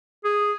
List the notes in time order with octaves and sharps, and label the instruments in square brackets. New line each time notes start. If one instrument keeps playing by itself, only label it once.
[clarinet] G#4